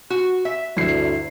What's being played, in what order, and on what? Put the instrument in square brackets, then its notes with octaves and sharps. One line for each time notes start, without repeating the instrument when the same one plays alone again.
[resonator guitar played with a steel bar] F#4
E5
[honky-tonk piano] G1 C7 [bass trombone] D2 [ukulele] E4